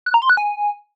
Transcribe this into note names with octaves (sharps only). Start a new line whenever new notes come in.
F#6
A#5
C6
F#6
G#5